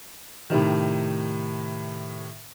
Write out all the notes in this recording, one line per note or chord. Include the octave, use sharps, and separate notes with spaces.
A2 C3 D#3